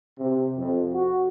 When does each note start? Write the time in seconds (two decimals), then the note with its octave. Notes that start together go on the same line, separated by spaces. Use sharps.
0.19 C3
0.58 F2
0.93 F#4